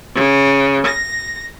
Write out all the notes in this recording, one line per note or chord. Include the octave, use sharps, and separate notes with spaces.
C#3
A#6